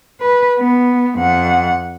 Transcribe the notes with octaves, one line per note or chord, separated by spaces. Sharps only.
B4
B3
F2 F#5